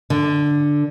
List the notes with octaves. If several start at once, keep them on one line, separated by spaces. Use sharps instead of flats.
D3